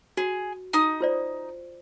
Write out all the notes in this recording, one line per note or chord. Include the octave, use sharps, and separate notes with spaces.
F#4 G#4
D#4 D#6
F4 C5 D5